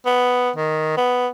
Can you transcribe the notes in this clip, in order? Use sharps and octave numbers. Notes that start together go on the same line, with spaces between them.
B3
D#3
B3